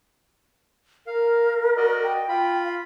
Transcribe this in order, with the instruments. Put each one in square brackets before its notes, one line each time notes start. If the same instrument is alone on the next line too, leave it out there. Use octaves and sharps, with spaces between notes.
[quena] A#4 [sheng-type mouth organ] F5
[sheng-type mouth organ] F#4 D5 D#5
[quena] G5
[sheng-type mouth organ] F4 B5
[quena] F5